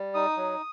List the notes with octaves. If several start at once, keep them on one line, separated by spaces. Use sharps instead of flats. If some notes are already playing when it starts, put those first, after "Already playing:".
Already playing: G3
D#4 D#6
F#3